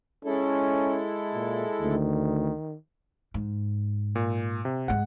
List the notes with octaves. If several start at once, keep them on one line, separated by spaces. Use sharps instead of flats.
G#3 C#4 E4 A4
A#2
D2 D#3
G#2
A#2
C3
G#2 G#3 F#5